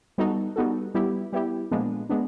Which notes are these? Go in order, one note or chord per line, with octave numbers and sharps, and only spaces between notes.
G3 B3 D#4 F#4 A4
G3 B3 D#4 F#4 A4
G3 B3 E4 G4
G3 B3 E4 G4
A#2 F3 G#3 B3 D4
G#3 B3 D4